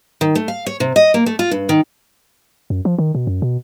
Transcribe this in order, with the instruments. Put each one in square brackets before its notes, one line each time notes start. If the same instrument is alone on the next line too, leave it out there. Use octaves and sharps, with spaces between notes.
[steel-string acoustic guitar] D#3
A3
F5
C#5
C3
D#5
A#3
A3
F4
G2
D#3
[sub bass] F#2
F3
D#3
B2
F#2
B2